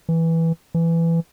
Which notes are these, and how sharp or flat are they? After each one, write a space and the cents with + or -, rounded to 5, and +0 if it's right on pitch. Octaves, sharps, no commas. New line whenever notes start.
E3 -5
E3 +15